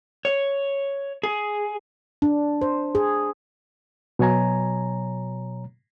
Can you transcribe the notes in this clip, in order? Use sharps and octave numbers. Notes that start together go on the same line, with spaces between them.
C#5
G#4
D4
C5
G#4
B2 F#3 C#5 G#5 A#5